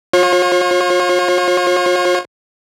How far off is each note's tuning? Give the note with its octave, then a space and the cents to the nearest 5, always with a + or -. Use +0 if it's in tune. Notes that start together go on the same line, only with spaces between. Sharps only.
F4 +35 C#5 -40